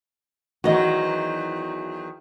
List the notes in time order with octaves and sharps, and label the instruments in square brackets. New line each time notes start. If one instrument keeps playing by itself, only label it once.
[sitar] E2 D#3 F#3 [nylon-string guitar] F#4 D#5